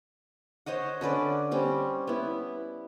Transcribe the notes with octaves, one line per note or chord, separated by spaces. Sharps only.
C5 C#5 D#5 F#5
D3 C#4 B4 D5
G3 C4 C#4
B3 E4